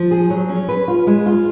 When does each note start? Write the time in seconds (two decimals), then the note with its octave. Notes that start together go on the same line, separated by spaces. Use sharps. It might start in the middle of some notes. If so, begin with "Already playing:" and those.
Already playing: F3
0.11 G#4
0.30 F#3
0.49 C#4
0.69 B4
0.88 F4
1.07 G#3
1.26 F4